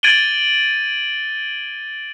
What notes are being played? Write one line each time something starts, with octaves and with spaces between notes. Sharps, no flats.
G#6 A6 D7 D#7 F#7 G7